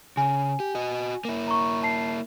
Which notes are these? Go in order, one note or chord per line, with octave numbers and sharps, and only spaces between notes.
C#3 G#5
G4
F#4 D#5
A#3 E4
A#5 C#6
A5 C7